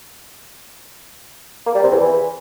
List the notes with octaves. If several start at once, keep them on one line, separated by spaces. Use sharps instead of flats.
A#3
G3
C3
E2
E3